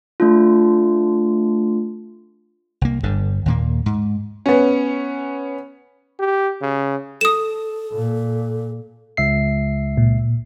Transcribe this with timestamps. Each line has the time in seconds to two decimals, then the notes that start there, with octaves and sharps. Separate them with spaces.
0.20 A3 D4 F4
2.81 C2 A#3
3.03 G1 G2 D3
3.46 D#2 A#2 A#3
3.86 G#2
4.46 B3 C#4
6.20 G4
6.62 C#3
7.21 A4 D#6 E7
7.92 A#2
9.17 C#2 E5 C7
9.97 A#2